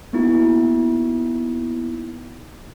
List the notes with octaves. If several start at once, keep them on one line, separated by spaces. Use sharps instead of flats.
A#3 B3 D#4 E4 F#4